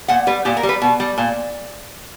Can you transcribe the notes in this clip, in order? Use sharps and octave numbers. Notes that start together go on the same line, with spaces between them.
A#2 F#5
G3 B4
A#2 G4
A#4
G3
B4
B2
G3
A#2